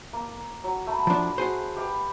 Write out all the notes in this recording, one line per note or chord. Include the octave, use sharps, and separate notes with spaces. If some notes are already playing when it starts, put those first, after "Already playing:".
A#3
F#3
A3 B5
F3 D4
F#4 G#4 C5
G4 B4 F5